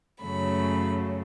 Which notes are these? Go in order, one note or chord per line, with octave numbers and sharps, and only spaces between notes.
F#2 C#3 F#3 A3 B5